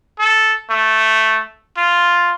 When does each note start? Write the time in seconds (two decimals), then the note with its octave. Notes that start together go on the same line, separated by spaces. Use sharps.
0.19 A4
0.70 A3
1.77 F4